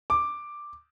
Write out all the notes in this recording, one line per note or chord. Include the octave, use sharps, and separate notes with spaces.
D6